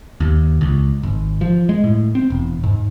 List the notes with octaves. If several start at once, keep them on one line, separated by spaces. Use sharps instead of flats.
D#2
C#2
G#1
F3
G#3
A2
C4
E1
G#2